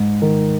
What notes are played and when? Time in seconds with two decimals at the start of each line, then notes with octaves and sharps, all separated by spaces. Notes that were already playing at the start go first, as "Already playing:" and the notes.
Already playing: G#2
0.22 D#3